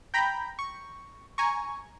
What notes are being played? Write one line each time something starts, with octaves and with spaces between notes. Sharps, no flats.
G5 A#5 B5 G6
C#6
G#5 A#5 C#6